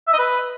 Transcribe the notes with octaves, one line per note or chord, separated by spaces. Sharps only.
E5
D#5
B4